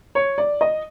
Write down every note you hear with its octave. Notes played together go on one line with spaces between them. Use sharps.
C#5
D5
D#5